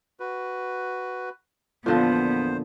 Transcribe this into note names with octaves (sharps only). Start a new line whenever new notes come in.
F#4 B4
E2 A#2 D3 F3 B3 C5